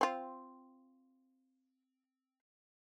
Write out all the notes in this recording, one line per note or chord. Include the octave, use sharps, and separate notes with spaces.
C4 F4